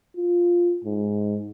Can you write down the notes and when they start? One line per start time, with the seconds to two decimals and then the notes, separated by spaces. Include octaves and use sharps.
0.17 F4
0.84 G#2